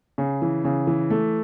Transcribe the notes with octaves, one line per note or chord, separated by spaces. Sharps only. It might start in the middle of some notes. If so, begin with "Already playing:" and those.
C#3
E3
C#3
E3
A3